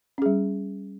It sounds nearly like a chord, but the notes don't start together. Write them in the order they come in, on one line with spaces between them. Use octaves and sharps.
C#4 G#4 G3